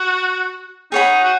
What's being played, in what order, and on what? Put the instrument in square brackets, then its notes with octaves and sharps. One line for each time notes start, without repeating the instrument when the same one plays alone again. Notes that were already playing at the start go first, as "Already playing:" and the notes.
Already playing: [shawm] F#4
[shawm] D#4 [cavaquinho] G#4 C#5 F#5 B5
[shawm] F#4